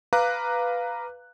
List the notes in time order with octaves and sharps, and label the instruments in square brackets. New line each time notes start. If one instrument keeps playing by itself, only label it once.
[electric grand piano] B4 F5 A#5 D6 F#6